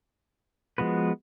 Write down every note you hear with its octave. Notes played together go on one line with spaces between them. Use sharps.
F3 G#3 B3 F#4 B4